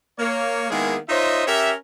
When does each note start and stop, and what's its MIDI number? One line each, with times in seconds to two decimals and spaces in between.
0.19 0.70 58
0.19 0.70 73
0.70 0.96 51
0.70 0.96 56
0.70 0.96 58
0.70 0.96 59
0.70 0.96 64
0.70 0.96 68
1.09 1.47 63
1.09 1.47 65
1.09 1.47 72
1.09 1.47 73
1.09 1.47 75
1.09 1.47 76
1.47 1.72 61
1.47 1.72 67
1.47 1.72 70
1.47 1.72 76